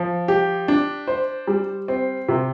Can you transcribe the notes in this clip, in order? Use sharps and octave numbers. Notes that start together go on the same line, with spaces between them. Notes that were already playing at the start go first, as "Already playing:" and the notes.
Already playing: F3
G4
D4
C5
G3
C4
C3